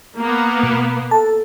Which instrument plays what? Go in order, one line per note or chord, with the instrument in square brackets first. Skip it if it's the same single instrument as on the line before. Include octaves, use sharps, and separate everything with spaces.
[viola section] A#3 B3
[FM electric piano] B2
[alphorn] A4 [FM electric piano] A5